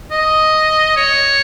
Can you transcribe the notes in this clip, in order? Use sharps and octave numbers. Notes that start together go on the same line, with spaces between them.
D#5
C#5